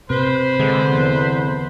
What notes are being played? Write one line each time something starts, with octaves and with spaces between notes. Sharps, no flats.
C3 B4 C5
D3 G#3
E2